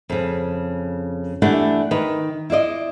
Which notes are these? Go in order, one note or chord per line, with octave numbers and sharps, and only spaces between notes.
F2 C#3
E3 A3 D4 E4 G4 F#5
D#3 B4
E4 F4 D5 D#5